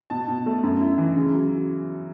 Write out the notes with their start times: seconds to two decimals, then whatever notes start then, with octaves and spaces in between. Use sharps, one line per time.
0.10 B2 A5
0.28 B2
0.46 A3
0.63 F#2
0.81 E4
0.98 E3
1.16 C#3
1.34 F#3